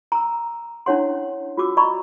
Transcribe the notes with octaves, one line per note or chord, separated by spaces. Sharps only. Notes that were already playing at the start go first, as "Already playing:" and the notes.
A#5 E6
C#4 D4 E4 C#5 F#5 C6
F4 F#4 D6 E6
D5 D#5 A#5 B5 C#6 D6